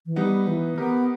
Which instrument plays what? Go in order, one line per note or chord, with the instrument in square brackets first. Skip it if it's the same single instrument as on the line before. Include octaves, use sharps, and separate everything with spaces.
[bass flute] E3
[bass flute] G3 [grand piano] B3 D#4
[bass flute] E3
[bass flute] B3 [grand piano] G4 A#4